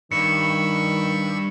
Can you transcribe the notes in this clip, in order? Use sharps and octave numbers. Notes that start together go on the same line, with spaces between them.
G2 D#3 B5 C#6 E6 C#7